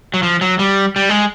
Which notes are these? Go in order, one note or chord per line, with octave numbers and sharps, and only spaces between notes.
F#3
F3
F#3
G3
G3
G#3